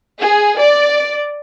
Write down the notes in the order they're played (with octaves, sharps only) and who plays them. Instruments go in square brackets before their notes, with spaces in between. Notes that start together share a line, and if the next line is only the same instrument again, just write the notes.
[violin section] G#4
D5